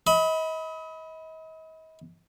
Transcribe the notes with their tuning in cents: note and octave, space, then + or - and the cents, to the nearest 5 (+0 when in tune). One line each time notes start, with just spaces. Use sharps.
D#5 +40 B5 +0